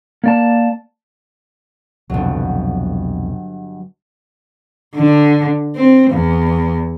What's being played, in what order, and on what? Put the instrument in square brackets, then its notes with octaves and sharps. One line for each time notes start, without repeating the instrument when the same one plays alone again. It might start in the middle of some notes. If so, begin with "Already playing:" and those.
[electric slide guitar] A#3 D5 A5
[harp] G1 F#3 [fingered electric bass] C2 F2 B2
[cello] D3
C4
E2